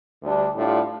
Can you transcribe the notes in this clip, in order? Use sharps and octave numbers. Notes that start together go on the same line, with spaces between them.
D2 D3 G3 D4
A2 G3 D4 F4